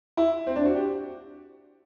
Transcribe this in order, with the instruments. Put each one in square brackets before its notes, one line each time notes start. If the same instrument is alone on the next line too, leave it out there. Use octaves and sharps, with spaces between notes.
[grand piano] E4
C4
D4
F#4
G4